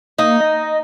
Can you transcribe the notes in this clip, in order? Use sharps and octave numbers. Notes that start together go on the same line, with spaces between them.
A#3 D#4
D#5